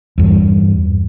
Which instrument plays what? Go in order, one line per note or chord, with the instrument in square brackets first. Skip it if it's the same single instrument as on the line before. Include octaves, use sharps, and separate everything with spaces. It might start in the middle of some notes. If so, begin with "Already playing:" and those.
[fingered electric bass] E2 G2